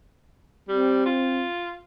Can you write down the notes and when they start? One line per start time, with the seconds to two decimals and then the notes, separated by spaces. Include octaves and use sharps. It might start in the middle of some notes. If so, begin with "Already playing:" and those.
0.69 G3 C4
1.06 F4